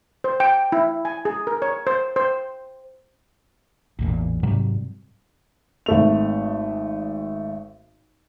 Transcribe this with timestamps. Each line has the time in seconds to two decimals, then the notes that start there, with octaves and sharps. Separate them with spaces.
0.24 C5
0.40 G5
0.72 E4
1.05 G#5
1.25 G#4
1.47 A#4
1.62 C#5
1.87 C5
2.16 C5
3.99 A1 E2 A#2
4.43 G#2 C3 F#3 G3
5.86 G#1 A3 F7